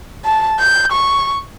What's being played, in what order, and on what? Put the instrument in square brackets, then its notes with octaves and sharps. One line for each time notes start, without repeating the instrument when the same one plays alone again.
[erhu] A5
G6
C#6